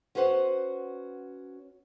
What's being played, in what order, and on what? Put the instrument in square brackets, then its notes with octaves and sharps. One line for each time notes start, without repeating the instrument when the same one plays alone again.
[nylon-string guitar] C#4 F#4 B4 C5 F#5